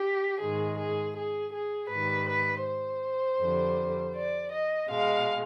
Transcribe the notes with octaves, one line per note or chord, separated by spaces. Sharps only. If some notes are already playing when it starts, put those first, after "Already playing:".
Already playing: G4
G#2 D#3 G#3 G#4
G#4
G#4
G#4
G#2 D#3 G3 B4
B4
C5
F2 D3 G3
D5
D#5
B2 G#3 F5